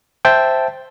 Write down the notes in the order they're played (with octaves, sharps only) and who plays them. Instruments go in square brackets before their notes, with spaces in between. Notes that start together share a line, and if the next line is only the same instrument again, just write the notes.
[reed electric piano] C5 E5 G5 A5